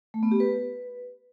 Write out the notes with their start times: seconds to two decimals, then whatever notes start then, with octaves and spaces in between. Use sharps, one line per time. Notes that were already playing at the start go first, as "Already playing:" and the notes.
0.14 A3
0.23 B3
0.31 G4
0.40 B4